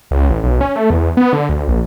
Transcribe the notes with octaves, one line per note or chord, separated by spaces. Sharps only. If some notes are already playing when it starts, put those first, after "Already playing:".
C#2
A1
B1
C#4
A3
E2
B3
D3
D2
A#1